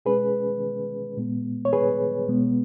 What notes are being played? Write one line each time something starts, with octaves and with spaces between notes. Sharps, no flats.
B2 G#3 C#4 G#4 B4
A#2 G#3 B3
C#5
G#4 B4
B2 G#3 B3